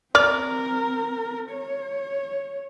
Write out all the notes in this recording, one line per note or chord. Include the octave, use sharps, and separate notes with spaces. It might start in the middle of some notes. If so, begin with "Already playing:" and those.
C4 A#4 D5 F6
C#5